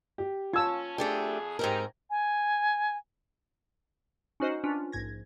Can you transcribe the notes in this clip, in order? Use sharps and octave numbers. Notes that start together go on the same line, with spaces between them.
G4
C#4 F4 A5 E6 G#6
F2 A3 D4 G4 G#4
G#2 C4 D#4 G4 A#4
G#5
C#4 D#4 F#4 C5 D#5 F#5
C#4 D4 F4 B4
A#1 G#2 G#6 A#6